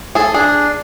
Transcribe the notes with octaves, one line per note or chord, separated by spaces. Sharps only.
G#4 A4
D4 G#4